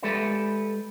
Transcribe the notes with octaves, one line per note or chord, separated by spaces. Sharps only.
G#3 G4 A4 B4 D5 E5